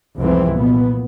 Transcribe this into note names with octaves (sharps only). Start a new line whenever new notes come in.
C2 F2 G#2 E3 C4
A#2 B3